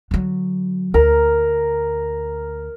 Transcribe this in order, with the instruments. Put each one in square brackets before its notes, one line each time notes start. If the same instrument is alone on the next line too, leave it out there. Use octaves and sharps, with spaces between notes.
[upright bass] D3 F#3
[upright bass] D2 [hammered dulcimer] A#4